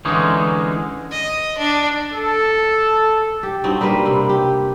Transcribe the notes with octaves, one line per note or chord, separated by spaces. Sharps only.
D3 E3 G#3 C#4 D#4
D#5
D4
A4
G4
G2 C4 D#4 F#4
G3 A#3 B4 C5
C3
G4